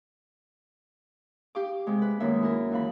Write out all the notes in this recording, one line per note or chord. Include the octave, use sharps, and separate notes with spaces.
G4 F5 D6
C3 G#3
B4
F#2 D#3 G#3 A#3 E5
E4 A#4
D#2 E3 F5 B5